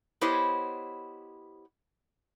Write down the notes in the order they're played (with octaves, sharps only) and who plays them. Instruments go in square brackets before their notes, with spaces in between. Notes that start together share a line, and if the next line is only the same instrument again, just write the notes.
[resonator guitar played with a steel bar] B3 E4 G4 C5 C#5 D#5